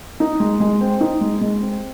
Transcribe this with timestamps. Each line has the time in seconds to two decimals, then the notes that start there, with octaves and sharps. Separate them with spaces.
0.20 D#4
0.40 G#3
0.60 G#3
0.81 C4
1.01 D#4
1.21 G#3
1.41 G#3
1.61 C4